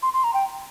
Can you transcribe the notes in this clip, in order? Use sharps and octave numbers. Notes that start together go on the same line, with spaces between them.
C6
C6
A#5
G5